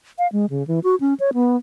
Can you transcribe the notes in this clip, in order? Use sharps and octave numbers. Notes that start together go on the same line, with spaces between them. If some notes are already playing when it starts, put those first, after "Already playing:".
F5
G#3
C#3
E3
F#4
C#4
C#5
B3